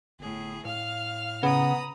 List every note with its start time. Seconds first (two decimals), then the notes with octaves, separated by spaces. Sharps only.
0.19 G1 A2 G#4
0.65 A2 F5 F6
1.43 C#3 B3 A#5 B5 D#6